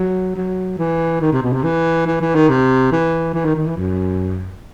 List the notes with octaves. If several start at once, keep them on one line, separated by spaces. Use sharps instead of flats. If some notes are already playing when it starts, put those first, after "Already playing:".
Already playing: F#3
F#3
E3
D#3
C3
B2
C3
E3
E3
E3
D#3
C3
E3
E3
D#3
D#3
E3
F#2